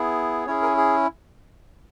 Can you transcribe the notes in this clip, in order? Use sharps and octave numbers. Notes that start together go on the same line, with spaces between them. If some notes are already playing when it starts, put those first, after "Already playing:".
Already playing: B3 E4 G#4
C#4 E4 G#4 C#5
A#4
G#4